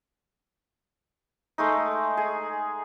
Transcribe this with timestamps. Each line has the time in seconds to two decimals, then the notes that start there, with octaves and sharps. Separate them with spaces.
1.58 G#3 A3 D#4
2.17 G#4